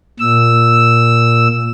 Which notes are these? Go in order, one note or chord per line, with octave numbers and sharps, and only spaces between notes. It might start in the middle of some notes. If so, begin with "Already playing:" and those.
A#2 E6